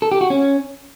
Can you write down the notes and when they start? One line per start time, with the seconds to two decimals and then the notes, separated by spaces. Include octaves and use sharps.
0.02 A4
0.12 G4
0.21 F#4
0.30 C#4